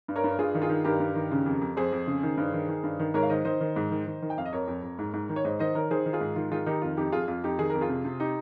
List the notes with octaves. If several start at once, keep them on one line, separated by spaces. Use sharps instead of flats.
G2
A#4 C#5
G2
G2 F4 G#4
D#3
F4 G#4
D#3
G2 G4 A#4
G2
D#3
C#3
F2
F2
F2 G#4 C5
F2
C#3
D#3
G2
D#3
D#3
G2
D#3
G#2 A#4 C#5
F5
D#3 C5 D#5
D#3 C5 D#5
D#3
G#2
D#3
D#3
D#3
G5
F2 F5
D#5
F2 A#4 C#5
F2
F2
G#2
G#2
D#3
C#5
G#2 C5 D#5
D#3 C5 D#5
D#3 A#4 C#5
D#3 G#4 C5
D#3
F4 G#4
G#2
D#3 F4
D#3 F4 G#4
D#3 D#4 G4
F2 F4
F2 D#4 G4
F2 F4 G#4
F2 F4
F2 D#4 G4
D#3 G#4
F2 A#4
F4 G#4
C3
C3
D#4 G4